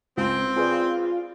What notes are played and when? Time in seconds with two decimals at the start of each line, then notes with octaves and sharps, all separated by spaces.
0.17 C#2 C4
0.56 F4 G#4 B4 D5